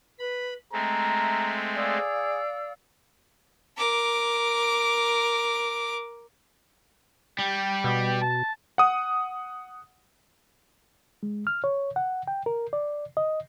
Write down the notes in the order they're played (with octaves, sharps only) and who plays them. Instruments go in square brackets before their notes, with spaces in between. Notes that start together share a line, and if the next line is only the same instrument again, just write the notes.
[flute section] B4 [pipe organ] B5
[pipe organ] G#3 A3 C4 [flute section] E5 F6 [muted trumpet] A#5
[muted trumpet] G#4 [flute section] D5 F5 E6
[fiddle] A#4 D6
[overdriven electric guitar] G3 [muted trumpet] G4
[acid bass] B2
[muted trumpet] A5
[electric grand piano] F#5 D#6
[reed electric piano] G#3
F6
C#5
F#5
G5
A#4
D5
D#5